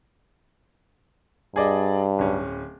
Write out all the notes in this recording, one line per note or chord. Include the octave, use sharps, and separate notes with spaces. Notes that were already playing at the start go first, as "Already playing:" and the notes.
G2 G#4 D5 D#5
D1 C#4